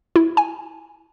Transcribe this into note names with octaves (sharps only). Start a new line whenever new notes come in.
E4
G#5